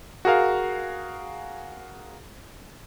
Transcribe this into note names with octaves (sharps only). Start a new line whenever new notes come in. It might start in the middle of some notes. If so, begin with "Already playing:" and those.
F#4 G#4 A#4 F5